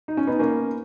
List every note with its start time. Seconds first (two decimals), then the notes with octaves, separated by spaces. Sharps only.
0.08 D#4
0.17 C#4
0.27 B3 D#4
0.39 A#3 C#4